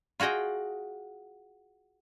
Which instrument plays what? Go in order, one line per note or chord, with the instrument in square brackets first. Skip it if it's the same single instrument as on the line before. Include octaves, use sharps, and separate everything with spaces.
[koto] F4 F#4 G#4 D#5 G5